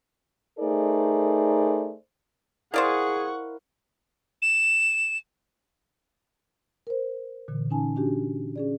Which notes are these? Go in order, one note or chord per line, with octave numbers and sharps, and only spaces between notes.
A3 D#4 G#4 A#4 C5 D5
E4 G#4 A#4 C5 D5 F5 F#5 C#6
E7
A#4 C5
A#2 D3 E3
C#4 D#4 G#5 A5
C#4 D4 F#4 G4
C#4 G#4 D5